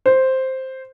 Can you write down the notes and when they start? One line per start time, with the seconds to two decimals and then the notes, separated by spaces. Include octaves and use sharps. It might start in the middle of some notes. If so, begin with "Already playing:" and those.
0.06 C5